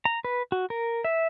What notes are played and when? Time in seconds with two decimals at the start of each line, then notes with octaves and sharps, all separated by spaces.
0.05 A#5
0.25 B4
0.52 F#4
0.70 A#4
1.04 E5